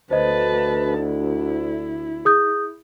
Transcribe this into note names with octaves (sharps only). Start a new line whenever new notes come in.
D2 B4 C5 D#5 A5
E4
G#4 D#6 G6